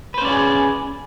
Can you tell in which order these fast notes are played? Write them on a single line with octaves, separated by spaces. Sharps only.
B4 C5 C#4 D5 G#4